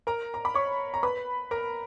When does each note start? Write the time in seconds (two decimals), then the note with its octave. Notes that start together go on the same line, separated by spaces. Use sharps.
0.07 A#4 A#5
0.34 A#5
0.45 B5
0.54 C#5 C#6
0.94 A#5
1.03 B4 B5
1.51 A#4 A#5